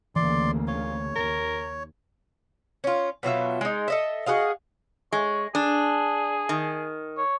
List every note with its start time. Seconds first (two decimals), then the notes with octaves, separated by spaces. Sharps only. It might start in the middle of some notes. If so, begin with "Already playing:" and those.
0.16 D2 C#3 E3 A#3 D5 C6
0.67 F4 C#5
1.15 D#2 A#4
2.84 C#4 F4
3.23 B2 F#3 F4 E5
3.61 G#3 D#4
3.88 A4 D#5 E5
4.26 F#4 G#4 D#5 F5
5.12 G#3 C#5
5.55 D4 G#4
6.49 D#3
7.17 C#5